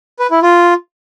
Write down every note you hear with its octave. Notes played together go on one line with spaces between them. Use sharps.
B4
E4
F4